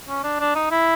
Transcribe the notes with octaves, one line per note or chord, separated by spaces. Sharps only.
C#4
D4
D4
D#4
E4